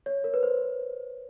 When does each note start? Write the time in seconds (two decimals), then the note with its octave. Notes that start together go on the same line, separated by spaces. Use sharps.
0.06 C#5
0.24 A#4
0.34 B4
0.43 C5